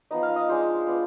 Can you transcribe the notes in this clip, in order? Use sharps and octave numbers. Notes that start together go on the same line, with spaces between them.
F3 B3 D#4 D#5
F5
D#5
G#3 D4 F4 C5
B3 D4 F4